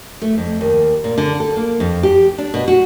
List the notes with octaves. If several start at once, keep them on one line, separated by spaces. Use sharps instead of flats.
A3
F2
D#2
A#2
D3
A4
A#3
F2
G4
D4
B2
F#4